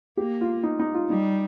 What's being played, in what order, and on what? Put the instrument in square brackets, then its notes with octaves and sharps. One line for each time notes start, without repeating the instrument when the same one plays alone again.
[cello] A#3 [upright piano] G4
[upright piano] F4
D#4
D#4
F4
[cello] G3 [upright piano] D#4